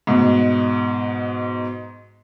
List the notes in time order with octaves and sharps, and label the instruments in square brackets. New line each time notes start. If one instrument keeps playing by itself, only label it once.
[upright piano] G#2 B2